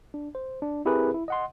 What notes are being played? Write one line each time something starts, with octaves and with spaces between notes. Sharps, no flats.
D4
C5
D4
C4 E4 G4 G#4 A#4 B4
E4
D#5 F#5 C6